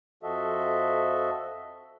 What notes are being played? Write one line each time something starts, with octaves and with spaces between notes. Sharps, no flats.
F2 F3 F#4 A4 D#5 E5